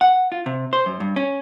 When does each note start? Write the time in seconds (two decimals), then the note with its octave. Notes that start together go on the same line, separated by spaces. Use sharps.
0.01 F#5
0.32 F4
0.46 C3
0.73 C5
0.86 F#2
1.00 G2
1.16 C#4